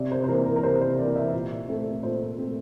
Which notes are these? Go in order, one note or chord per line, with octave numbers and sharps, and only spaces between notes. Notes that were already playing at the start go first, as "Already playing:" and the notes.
Already playing: C3 D5
C5
C5
E3 A#3 A#4
A#4
A#4
C3 C5
C5
E3 A#3 D5
E5
A#2
A3 C4
A#2 C5
A3 C4